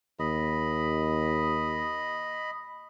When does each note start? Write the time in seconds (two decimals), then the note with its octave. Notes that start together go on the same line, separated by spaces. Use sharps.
0.20 D#2 D#5 B5